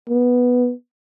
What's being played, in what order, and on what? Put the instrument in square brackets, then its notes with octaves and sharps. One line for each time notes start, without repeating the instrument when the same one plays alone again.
[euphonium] B3